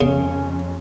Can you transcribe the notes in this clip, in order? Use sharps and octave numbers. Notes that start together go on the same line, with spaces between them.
F2 C#3 C#4